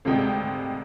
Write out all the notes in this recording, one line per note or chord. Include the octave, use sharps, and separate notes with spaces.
G#1 D2 C3 G#3 G5